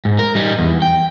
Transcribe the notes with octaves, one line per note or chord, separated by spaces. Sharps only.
G#2
A#4
G3 D#4
E2
G5